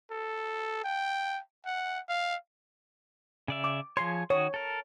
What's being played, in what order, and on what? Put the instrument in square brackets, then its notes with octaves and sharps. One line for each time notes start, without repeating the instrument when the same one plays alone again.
[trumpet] A4
G5
F#5
F5
[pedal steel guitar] C#3 D5 E5
[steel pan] D6
[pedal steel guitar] F3 G#4 C#5 [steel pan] C6
[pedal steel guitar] D#3 F#4 D#6 [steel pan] C#5
[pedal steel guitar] A4 A#4